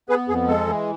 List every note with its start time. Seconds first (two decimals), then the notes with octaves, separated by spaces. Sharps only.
0.09 B3 G#4 B4
0.28 F2 G#4
0.48 G#3 A4
0.67 E3